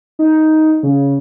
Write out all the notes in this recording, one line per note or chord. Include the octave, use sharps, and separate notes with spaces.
D#4
C#3